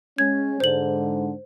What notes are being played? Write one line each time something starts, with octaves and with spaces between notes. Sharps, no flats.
G#3 C#4 G#6
G#2 D3 C5 F#7